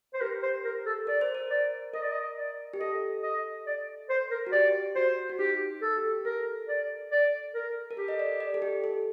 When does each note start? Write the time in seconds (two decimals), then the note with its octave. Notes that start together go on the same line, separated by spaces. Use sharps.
0.14 C5
0.21 G4 A#4
0.43 C5
0.65 A#4
0.86 A4
1.07 A#4 D5
1.21 C5
1.35 A#4
1.50 D5
1.94 A#4 D#5
2.02 D5
2.12 D#5
2.37 D5
2.74 G4
2.80 A4 D#5
3.23 D#5
3.67 D5
4.10 C5
4.31 A#4
4.47 F#4
4.52 G4 D5
4.96 F#4 C5
5.30 F#4
5.39 D#4 G4
5.82 A4
5.97 G4
6.25 A4 A#4
6.68 D5
7.11 D5
7.55 A#4
7.91 A#4
7.97 G4 A4
8.08 D#5
8.19 D5
8.40 D5
8.54 A4
8.62 G4
8.84 A4